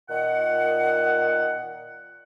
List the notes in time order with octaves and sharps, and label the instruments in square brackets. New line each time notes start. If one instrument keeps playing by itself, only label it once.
[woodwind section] A#2 D#3 F#5